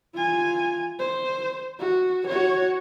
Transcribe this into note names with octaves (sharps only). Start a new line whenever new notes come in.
F4 G#5
C5
F#4
F#4 C#5